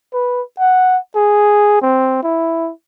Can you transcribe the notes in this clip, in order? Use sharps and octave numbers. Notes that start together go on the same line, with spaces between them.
B4
F#5
G#4
C4
E4